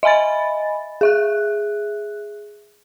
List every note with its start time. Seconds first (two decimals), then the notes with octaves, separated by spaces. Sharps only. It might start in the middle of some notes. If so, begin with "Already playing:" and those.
0.03 D#5 E5 G#5 B5 A6
1.01 G#4 E5 F#6